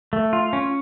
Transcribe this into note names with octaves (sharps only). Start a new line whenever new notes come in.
A3
F4
C#4